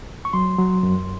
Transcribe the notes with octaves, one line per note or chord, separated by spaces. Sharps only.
C#6
F#3 C6
F#3
F#2